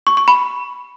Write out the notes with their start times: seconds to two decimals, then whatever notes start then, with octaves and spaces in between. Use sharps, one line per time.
0.07 C#6
0.17 C#6
0.28 B5